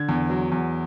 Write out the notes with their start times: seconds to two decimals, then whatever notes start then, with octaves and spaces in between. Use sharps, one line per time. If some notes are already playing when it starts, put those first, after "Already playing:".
Already playing: D3 G#6
0.09 E2
0.30 F#3
0.52 E2